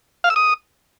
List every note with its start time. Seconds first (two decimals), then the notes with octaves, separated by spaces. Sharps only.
0.24 F5
0.30 E6
0.36 D#6